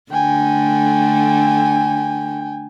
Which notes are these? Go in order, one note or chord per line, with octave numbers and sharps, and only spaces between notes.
D3 A3 G5 G#5